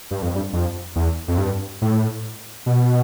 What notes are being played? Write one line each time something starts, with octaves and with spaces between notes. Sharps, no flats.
G2
F2
G2
F2
E2
F2
G2
A2
B2